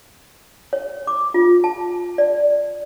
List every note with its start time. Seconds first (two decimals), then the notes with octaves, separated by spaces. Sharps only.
0.73 C#5
1.07 D6
1.34 F4
1.64 A5
2.18 D5